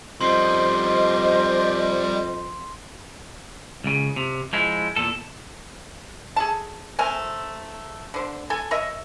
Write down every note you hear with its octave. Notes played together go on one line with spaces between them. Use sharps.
F2 G3 D#4 C5 D#5 C6 C7
C#2 C#3
C3
F3 G#3 E4
E2 A#2 A4
G#4 A4 A5
A3 C4 A#4 G#5
D3 C5
A4 G#5
A#4 C#5 D#5 E5